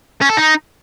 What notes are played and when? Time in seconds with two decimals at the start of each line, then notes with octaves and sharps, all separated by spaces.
0.21 C#4
0.29 A4
0.37 D#4